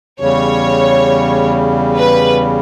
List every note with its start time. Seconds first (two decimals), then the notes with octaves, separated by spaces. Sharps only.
0.20 E2 C#3 G3 C#5
1.98 B4